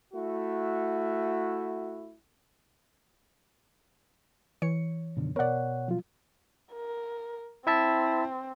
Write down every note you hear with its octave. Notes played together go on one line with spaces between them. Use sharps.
A3 E4 F#4
E3 C#5 C#7
F#2 B2 D3 D#3
B2 B3 A#4 C#5 D5 F#5
F3 F#3 F4
A#4
C4 E4 E5 A5